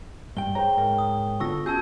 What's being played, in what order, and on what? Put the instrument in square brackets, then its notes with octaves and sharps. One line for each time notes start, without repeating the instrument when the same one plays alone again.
[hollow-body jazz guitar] G2 G5 [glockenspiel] G7
[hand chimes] G#4 C#5 G5 [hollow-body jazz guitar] C5 A#5
[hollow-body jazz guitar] G#2 A#4
[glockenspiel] D#6
[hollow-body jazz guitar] D3 A4 [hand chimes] B3 F4 [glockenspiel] C#6 E6 A#6
[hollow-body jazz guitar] C#4 G#4 [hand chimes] F#4 G#6 [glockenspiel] A5 E6 G6